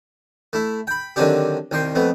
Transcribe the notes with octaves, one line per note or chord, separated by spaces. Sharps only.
A3 E4
G5 B5
D3 D#3 F#3 C4 D4 G4
C2 D#3 G5 C6 C#6
F2 A3 B3